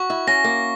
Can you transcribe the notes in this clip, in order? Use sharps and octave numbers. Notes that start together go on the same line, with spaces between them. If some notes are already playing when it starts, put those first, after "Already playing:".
Already playing: F#4 C#6
E4
C#4 A#6
A#3